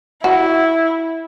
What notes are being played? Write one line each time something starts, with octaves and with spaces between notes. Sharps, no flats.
E4 F#4